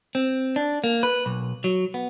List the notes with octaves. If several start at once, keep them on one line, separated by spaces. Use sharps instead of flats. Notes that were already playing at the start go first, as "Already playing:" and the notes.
C4
D4
A#3
B4
B1
F#3
B3